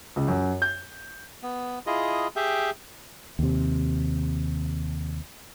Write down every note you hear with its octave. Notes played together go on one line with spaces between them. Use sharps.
C#2
F#2
G6
B3
E4 F4 G#4 D#5
G4 G#4 E5 G5
D#2 C3